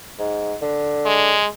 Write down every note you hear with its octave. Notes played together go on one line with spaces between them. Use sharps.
G#2
D3
G#3